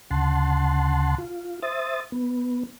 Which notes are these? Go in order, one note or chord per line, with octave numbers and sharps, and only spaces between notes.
D2 C#3 F#5 A5 C6
F4
C5 E5 D#6 A6
B3